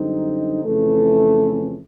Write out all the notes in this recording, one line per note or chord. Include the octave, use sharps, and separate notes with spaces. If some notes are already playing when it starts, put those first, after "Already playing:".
Already playing: F#2 D3 G3 C4 D#4
F2 C#3 E3 A3